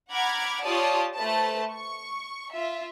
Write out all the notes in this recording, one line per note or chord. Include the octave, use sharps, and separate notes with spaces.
F#5 A#5 B5 D6 F6 G#6
F4 G4 C#5 D5 A5 D#6
A3 B4 C5 A5
C#6
F4 E5